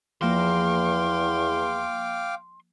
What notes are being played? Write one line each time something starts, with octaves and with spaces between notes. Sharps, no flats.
E2 F3 A#3 F5 G5 C6 D6